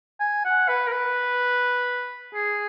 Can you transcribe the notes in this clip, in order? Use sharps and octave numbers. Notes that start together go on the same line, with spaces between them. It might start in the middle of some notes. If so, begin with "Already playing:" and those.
G#5
F#5
B4
A#4
B4
G#4